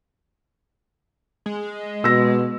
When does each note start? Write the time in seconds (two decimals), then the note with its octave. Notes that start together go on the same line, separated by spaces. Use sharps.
1.46 G#3
2.04 B2 E6 A#6